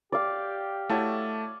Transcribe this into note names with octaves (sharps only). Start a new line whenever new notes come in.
G4 D5 F5
A3 E4 F#4 C#5 A5